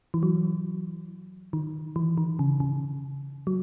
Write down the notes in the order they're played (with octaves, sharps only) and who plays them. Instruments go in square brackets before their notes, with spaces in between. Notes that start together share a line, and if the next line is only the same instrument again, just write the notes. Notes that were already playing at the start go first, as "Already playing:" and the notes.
[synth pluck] E3
F#3
D#3
E3
D#3
C#3
C#3
F#3